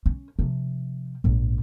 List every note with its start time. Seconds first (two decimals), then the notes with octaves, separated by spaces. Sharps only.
0.06 C#4
0.39 C3 F3
1.24 A#1 G#2